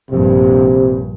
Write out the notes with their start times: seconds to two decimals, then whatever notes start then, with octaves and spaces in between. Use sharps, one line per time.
0.10 A#1 G2 C3